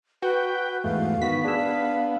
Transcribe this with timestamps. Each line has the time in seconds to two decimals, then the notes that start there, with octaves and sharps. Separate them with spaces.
0.22 F#4 B4 G5
0.84 E2 G#2 A3 F5
1.22 D#3 B3 F#4 B6
1.44 D4 G#4 E6
1.57 F5